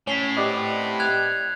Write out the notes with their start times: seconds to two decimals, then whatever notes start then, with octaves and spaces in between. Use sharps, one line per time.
0.07 A2 C#4 B6 C7 G7
0.37 C4 G4 B4 D5 D#5 F#5
1.00 F#6 G#6 F7